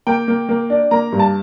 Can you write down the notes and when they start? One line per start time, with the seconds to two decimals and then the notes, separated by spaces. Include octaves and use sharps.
0.07 A#3 G5
0.28 A#3
0.49 A#3
0.70 D4
0.91 A#3 A#5
1.12 G2
1.19 A5